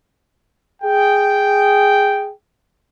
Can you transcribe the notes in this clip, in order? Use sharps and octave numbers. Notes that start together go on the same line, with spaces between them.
G#4 G5